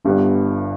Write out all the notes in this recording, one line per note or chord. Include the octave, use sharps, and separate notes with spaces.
G1 G2 G3 B3